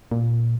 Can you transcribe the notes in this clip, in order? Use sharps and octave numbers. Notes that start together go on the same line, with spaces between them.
A#2